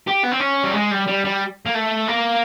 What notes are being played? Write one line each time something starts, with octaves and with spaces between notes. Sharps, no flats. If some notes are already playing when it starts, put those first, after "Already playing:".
G4
B3
C4
C#4
G3
G#3
G3
G3
G3
A#3
A3
A#3